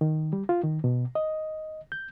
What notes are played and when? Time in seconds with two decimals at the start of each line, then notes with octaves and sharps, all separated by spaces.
0.01 D#3
0.33 G3
0.49 F4
0.63 D#3
0.84 B2
1.15 D#5
1.92 G6